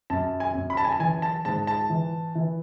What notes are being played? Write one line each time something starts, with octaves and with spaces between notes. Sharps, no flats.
F#2 A5
G#5
F#2
B5
A5
G#5
A5
E3 G#5
A5
G#2 A5
A5
E3
E3